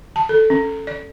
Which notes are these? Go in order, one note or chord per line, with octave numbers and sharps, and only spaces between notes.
A5
A4
C#4
D5